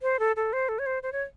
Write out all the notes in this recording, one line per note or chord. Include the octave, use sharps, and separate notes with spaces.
C5
A4
A4
C5
A4
C#5
C5
C5
C#5